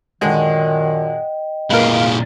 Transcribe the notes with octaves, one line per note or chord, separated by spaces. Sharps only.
F#2 A#2 D3 D#3 G#3 D#5 G5
A#2 G#3 A#4 B4 F5